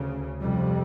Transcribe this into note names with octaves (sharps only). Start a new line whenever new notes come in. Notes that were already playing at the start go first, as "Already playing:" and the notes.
Already playing: D2 C#3
F2 C3 G3